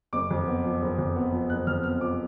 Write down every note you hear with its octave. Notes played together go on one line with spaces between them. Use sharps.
F#1 D6
F2
B3
F3
F#1
F2
B3
F3
F#1 F#6
F2 F6
B3 F6
F3 D6